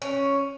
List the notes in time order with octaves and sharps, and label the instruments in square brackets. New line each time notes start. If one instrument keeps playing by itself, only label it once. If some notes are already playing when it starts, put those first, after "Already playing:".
[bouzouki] C#4